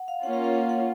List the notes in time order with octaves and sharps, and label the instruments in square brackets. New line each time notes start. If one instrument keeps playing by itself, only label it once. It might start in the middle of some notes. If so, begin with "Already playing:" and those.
Already playing: [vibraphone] F#5
F5
[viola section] A#3 C#4 F4 [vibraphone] F#5
[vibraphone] F5
F5
F#5
F#5